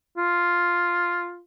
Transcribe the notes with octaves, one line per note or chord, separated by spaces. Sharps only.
F4